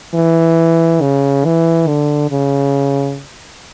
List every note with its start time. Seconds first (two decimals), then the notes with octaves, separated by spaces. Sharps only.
0.14 E3
1.01 C#3
1.45 E3
1.87 D3
2.31 C#3